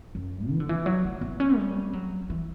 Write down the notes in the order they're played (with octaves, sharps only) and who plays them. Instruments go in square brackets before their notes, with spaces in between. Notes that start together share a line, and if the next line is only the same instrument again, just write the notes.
[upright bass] F#2
E3
D3
E3
F#3
A3
B3
C#4
G3
F#3
E3